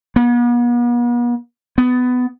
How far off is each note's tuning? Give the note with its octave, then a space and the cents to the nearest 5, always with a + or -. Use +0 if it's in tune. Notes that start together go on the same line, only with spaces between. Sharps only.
B3 -45
B3 +15